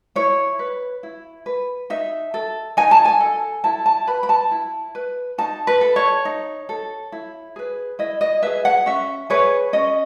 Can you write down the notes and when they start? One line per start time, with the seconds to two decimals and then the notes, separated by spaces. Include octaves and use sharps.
0.16 E4 C#5
0.59 B4
1.03 E4
1.46 B4
1.90 D#4 E5
2.34 A4
2.77 D#4 G#5
2.91 A5
3.05 G#5
3.20 A4
3.64 E4 A5
3.86 A5
4.07 B4 B5
4.23 B5
4.29 A5
4.51 E4
4.95 B4
5.38 D#4 A5
5.67 B4
5.81 A4
5.96 C#5
6.25 D#4
6.69 A4
7.12 E4
7.56 G#4 B4
7.99 E4 D#5
8.21 D#5
8.42 G#4 B4 E5
8.65 F#5
8.86 C#4 E5
9.30 G#4 B4 C#5
9.73 C#4 D#5